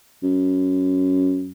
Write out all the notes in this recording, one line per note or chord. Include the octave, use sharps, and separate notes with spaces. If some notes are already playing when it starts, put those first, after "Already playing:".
F#2